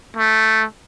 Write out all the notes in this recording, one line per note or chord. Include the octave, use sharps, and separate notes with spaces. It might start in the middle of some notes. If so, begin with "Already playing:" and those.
A3